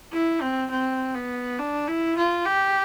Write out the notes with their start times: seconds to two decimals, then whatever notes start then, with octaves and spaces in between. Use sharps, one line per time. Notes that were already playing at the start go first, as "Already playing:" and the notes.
0.12 E4
0.42 C4
0.70 C4
1.15 B3
1.59 D4
1.88 E4
2.17 F4
2.46 G4